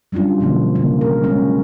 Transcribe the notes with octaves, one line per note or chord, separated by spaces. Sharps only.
F#3 G3 C#4 D4 F4
B2 D3 F3 A#3
C#3 A#3
A#4
F#3 G#3 C#4